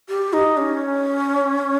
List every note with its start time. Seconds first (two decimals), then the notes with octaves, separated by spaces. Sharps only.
0.09 G4
0.33 D#4
0.57 C#4